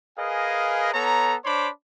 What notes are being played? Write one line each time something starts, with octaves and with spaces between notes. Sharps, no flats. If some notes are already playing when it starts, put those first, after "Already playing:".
G#4 A#4 B4 D#5 F5 G#5
B3 A4 C#5 A#5
D4 C5 C#5 B5 C6 D6